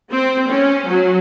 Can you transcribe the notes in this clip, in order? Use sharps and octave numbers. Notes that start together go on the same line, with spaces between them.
C4
C#4
F#3